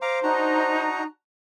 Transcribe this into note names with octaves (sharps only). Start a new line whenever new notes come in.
C5 F5 A#5 D6
D4 D#4 F#4 A#5